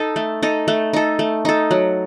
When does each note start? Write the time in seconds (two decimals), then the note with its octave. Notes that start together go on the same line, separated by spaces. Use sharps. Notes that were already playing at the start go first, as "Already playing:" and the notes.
Already playing: D#4 A4
0.16 A3
0.43 D#4 A4
0.68 A3
0.93 D#4 A4
1.19 A3
1.45 D#4 A4
1.71 F#3